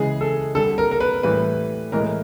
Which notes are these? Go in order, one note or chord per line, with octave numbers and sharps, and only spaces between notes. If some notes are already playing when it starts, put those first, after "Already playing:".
Already playing: C#3 E3 G#3 G#4
A4
D3 G3 A4
A#4
A#4
B4
A2 E3 G3 B4
A2 E3 G#3 A#4